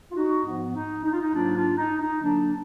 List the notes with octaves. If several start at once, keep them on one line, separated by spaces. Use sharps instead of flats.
F4
D#4 F#4
G#2 F3 B3
D#4
D#4
F4
D#4
G#2 F#3 A#3 D4 F4
D4 F4
D#4
D#4
D3 F#3 A#3 D4